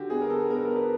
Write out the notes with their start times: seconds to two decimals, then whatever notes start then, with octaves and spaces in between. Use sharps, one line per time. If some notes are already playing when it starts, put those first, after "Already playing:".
Already playing: D3 F#4 G4
0.10 B3 G#4
0.21 A#4
0.30 A4
0.49 B3 A#4
0.65 A#4
0.76 B4